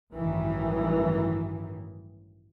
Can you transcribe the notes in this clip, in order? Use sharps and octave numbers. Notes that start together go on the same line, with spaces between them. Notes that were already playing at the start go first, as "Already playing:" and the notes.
A1 G2 D#3 E3 F#3